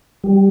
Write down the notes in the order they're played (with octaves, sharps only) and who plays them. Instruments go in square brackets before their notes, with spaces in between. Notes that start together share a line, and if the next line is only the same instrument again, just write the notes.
[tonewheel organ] G3